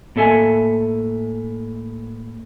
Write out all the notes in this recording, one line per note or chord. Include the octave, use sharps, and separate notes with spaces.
A2 A#3 A4 E5 G#5